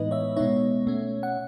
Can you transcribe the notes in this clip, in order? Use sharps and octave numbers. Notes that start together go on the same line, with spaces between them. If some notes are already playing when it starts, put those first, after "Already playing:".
Already playing: A2 E3 G#3 B3 D#4 B4 D#5
C#5 E5
B2 G#3 B3 D#4 C#5 E5
B2 A3 C#4
F#5